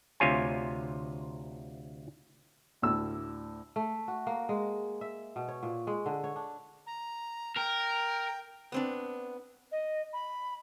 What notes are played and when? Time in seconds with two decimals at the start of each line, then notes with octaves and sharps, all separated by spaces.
0.20 D2 C3 F4 C#5 G#5
2.82 D2 A2 E6
3.76 A3
4.08 F#4
4.27 A#3
4.49 G#3
5.01 E5
5.36 B2
5.48 C#5
5.63 A#2
5.87 G#3
6.06 D3
6.24 C#5
6.36 D4
6.86 A#5
7.56 A#4 G5
8.72 B3 C4 D4
9.71 D#5
10.12 B5